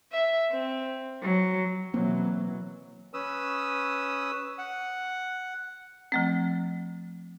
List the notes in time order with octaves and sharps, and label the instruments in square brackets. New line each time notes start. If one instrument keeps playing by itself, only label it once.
[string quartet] E5
C4
F#3
[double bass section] B2 E3 [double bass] F#3 [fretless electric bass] A#3 C4
[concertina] C#4 B4 D#6 E6
F#5
[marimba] F3 A3 C4